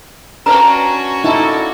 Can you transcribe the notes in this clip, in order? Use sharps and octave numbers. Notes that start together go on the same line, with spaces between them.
C#4 D4 F#4 A#4 B4 A#5
A#2 D#4 E4 A4